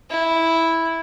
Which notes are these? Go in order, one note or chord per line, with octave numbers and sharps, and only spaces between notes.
E4